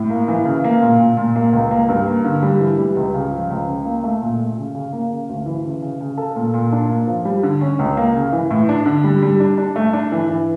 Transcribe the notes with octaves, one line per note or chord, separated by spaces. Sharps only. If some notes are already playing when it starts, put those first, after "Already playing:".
Already playing: A2
A#3
E3
C#3
A#3
A#2
A#2
A#2
A#3
C#2
A#3
G2
A#3
D3
G3
E3
G3
C#2
C#3
F3
C#2
C#3
A#3
A3
A#2
A3
C#3
C#3
A#3
C#3
D2
E3
C#3
C#3
C#3
A4
A#2
A#2
D4
A#3
F3
G3
D3
C#4
C#2
A#3
C#3
E3
A2
D4
D3
G3
G3
D4
D4
A3
D4
E3
E3